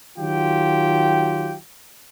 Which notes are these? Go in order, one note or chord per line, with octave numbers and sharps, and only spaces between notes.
D#3 F#3 F4 G4 G5